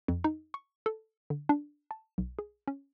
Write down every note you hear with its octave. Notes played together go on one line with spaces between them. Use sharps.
F2
D#4
C#6
A4
D3
D4
A5
B1
G#4
C#4